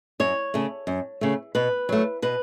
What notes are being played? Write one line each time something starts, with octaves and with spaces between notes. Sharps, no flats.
F#2 C#5
C#3 A3
F#2
C#3 A3
B2 B4
F#3 A3
B2 B4